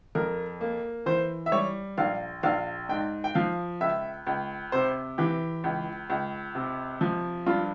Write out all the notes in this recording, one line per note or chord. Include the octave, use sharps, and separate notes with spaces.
F2 A#4
A#3
E3 C5
E5
G3 C#5
A#1 F5
A#1 F5
G#2 G5
G5
F3 F5
C#2 E5
C#2
C3 C5
E3 G4
C#2
C#2
C3
F3
G2 F4